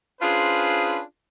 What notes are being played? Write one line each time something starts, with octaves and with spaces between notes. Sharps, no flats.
C#4 D4 F4 G#4 B4 C5